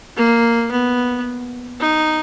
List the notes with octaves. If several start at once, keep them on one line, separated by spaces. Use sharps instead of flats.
A#3
B3
D#4